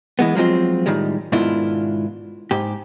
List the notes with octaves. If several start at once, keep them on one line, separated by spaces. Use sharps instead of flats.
E3 G#3 B3
F3 F#3 G#3 C4 F4
A2 D#3 G3 G#3
G#2 B2 D#3 D4 E4 F4
G#2 G4